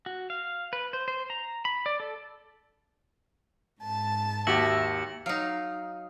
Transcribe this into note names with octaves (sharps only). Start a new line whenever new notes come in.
F#4
F5
B4
C5
C5
A#5
B5
D5
A4
G#2 A5
D#2 F#4 G4 E5 A#6 C#7 F#7
F#3 D#4 F5